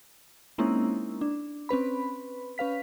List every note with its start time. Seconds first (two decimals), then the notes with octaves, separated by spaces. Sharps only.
0.58 G#3 A#3 C4 C#4 D#4 E4
1.21 D4
1.69 C4 C#4 B4 B5
2.58 C#4 B4 F5 B6